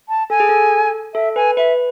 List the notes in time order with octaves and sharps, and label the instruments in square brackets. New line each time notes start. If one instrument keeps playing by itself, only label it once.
[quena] A5
[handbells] A4 [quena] G#5
[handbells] G#4
A4
[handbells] A4 [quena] E5
[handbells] B4 [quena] G#5
[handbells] B4 [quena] E5